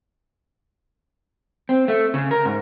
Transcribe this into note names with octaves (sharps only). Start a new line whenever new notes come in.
C4
A3
C#3
A#4
G#2